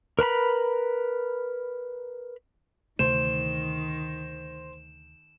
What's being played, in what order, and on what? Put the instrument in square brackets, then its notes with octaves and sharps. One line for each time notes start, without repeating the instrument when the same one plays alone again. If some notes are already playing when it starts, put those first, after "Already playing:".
[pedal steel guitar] A#4 B4 A#5 B5
[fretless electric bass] D2 C3 A3 [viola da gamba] D#3 [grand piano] C5 [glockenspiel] E7